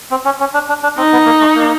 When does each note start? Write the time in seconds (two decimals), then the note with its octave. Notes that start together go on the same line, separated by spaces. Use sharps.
0.11 C4
0.25 C#4
0.40 C#4
0.54 D4
0.69 D4
0.83 D4
0.97 C4 D#4
1.12 B3
1.26 A#3
1.41 A3
1.55 A#3